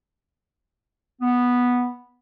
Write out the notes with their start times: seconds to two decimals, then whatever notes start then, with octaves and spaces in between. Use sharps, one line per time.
1.20 B3